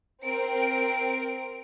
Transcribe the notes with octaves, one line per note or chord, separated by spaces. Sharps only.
C4 A#4 D7